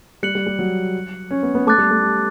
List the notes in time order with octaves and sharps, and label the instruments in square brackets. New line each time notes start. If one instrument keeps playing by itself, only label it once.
[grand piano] G3 [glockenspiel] F#6 C#7 F#7
[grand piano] G3
G3
F#3
C#4
B3
B3
[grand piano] A3 [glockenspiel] A5 D6 F#6 A6
[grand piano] G3
A3
G4